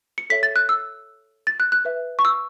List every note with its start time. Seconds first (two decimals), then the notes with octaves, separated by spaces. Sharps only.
0.18 C#7
0.30 A4 C#5 E5 B6
0.43 A6
0.56 F#6
0.69 E6
1.47 A6
1.60 F#6
1.72 F#6
1.85 B4 E5
2.19 C#6
2.25 E6